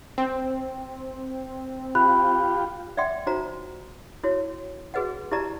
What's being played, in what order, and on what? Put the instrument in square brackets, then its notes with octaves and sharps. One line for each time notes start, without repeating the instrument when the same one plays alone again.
[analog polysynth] C4
[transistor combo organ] F4 G4 [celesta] B5 F#6
[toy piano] D5 E5 F#5 G5 C6
D#4 F4 F#4 C5 A#5
E4 F#4 C#5
F#4 G#4 B4 D#5 F#5
E4 G4 D5 D#5 A5 A#5